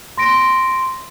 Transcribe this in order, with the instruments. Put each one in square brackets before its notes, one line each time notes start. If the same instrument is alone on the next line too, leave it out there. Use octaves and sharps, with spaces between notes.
[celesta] C6 A#6 D7